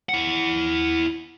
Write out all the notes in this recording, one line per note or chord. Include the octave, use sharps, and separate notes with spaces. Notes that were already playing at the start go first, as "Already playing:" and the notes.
E4 F#5